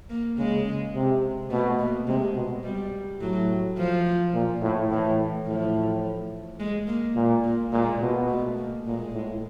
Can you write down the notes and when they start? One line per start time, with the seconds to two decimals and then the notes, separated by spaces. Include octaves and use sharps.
0.10 A#3
0.38 C#3 G#3
0.94 C3
1.50 B2 A3
1.79 A#3
2.07 C3 G#3
2.35 B2
2.64 G3
3.20 A2 F#3
3.77 F3
4.34 A#2
4.61 A2
4.90 A2 E3
5.46 A2 F3
6.60 G#3
6.87 A#3
7.15 A#2
7.44 A#3
7.72 A#2 G#3
8.01 B2
8.28 A3
8.57 A#3
8.86 A#2 G#3
9.13 A2